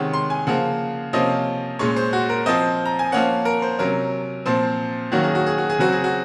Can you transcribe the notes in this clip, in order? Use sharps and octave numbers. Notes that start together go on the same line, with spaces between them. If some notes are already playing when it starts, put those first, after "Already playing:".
Already playing: C3 D#3 G#3 C#4 F#5
C6
G#5
C#3 F3 A#3 F#5
C3 F3 A#3 C#4 D#5
A#2 G#3 C#4 C#5
C5
F#4
A#4
F3 C4 D#5
A#5
G#5
F3 A#3 C#4 F#5
A#4
C5
C3 F#3 C#4 A#4
A#2 F3 C4
D#3 F#3 A#3 C#4 F#4
G#4
F#4
G#4
F#4
G#4
C#3 F#3 C4 F#4
G#4
F#4